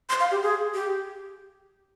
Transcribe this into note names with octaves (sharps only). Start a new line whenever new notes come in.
C6
F5
G4
G#4
G4